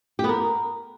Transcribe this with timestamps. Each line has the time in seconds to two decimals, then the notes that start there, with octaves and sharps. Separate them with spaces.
0.19 G4
0.24 B3
0.29 A#4